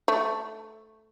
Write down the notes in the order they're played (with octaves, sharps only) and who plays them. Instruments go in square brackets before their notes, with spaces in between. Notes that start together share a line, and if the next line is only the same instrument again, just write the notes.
[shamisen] A3